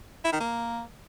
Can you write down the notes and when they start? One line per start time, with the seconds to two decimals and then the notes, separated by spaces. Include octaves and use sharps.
0.25 E4
0.32 D#3
0.40 A#3